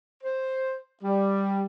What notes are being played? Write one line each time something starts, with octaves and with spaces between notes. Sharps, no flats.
C5
G3